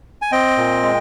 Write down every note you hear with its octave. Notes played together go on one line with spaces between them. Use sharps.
G#5
C4 D#5 G5
A#2
G#3